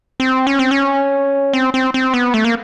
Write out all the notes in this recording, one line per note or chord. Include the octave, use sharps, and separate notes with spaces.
C4
C#4
C4
C#4
C4
C4
C4
B3
A3
A#3